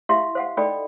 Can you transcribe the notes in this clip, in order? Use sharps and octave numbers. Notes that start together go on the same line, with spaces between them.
E4 G4 E5 F5 A#5 C6
C5 F5 F#5
D#4 A4 D5 D#5 G5 B5